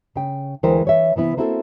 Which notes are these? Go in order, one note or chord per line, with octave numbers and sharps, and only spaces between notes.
C#3 G5
D2 E3 G#3 A#4 C5 G5
E3 C#5 E5
C3 E3 B3 E4
A#3 C4 E4 F#4 G4 A4